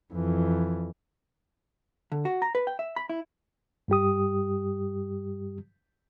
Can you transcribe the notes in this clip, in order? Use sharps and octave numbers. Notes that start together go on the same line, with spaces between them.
F2 E3
D3
F#4
A#5
B4
G5
E5
B5
E4
G2 G3 G4 D#6